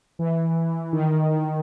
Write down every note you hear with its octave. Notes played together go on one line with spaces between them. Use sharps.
E3
D#3